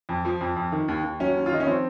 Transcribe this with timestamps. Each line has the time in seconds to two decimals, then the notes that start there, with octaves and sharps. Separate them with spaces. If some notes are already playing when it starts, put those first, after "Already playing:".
0.09 F2
0.25 F3
0.41 F2
0.56 F2
0.72 D#3
0.88 D#2
1.04 D#2
1.20 F#3 C#4
1.35 D#2
1.46 F4
1.51 D#3 D#4
1.60 C#4
1.67 F3 C4